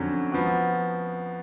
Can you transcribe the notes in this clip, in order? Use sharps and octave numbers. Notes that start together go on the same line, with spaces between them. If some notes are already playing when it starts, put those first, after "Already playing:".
Already playing: F2 D3 F#3 C#4
F3 B3 F#4